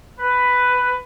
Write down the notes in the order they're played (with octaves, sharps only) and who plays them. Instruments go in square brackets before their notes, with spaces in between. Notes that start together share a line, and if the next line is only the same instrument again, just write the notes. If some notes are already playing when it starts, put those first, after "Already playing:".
[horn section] B4